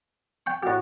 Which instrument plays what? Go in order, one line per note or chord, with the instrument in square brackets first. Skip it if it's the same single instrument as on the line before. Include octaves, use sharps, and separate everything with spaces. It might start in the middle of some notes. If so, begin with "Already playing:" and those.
[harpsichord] G5 C#6
[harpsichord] A2 G4 [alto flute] F#4